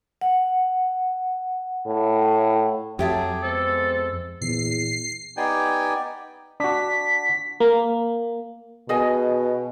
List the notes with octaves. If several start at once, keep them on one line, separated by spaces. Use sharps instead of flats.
F#5
A2
F2 F#3 G4 G#4 E5 A5
G#3 B3 A4 C5
E2 A#2 E3 C7
B3 D#4 G4 D5 G5 G#5
D4 F#4 B6
A#3
B2 G#4 D#5 G#5